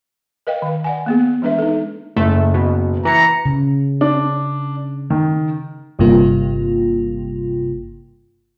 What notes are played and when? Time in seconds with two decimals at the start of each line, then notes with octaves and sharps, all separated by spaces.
0.47 A#4 B4 D#5 F5 G5
0.62 D#3 F5
0.84 D5 F#5 G#5
1.06 A#3 B3 G#4
1.42 E3 G#3 D4 B4 E5
1.59 D#4 A4
2.16 F#1 A3
2.54 B2
3.05 E3 A#5 C#7
3.46 C#3
4.01 D4
5.10 D#3
5.99 G1 G2 C3 A#3 F4